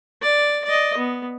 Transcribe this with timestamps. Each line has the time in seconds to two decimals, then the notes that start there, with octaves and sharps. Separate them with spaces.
0.22 D5
0.65 D5 D#5
0.97 B3